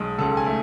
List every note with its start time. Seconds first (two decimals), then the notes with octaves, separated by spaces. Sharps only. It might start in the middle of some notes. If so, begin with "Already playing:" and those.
Already playing: B1 G#3
0.18 C#2 A4
0.37 G#5
0.47 A3